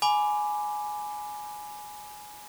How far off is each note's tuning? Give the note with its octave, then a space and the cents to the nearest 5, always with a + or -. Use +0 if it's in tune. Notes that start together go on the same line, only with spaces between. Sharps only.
G#5 +10 B5 +0 D6 +0